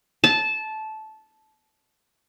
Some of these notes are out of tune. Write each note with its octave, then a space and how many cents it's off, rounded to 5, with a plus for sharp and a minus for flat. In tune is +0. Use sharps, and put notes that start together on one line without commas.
A5 -15